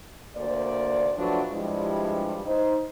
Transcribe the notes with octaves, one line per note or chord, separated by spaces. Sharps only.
D2 A#3 C5 D5
F3 F#3 A3 D4 F#4 B4
G2 F3 G3 G#3 D4 E4
D#4 C5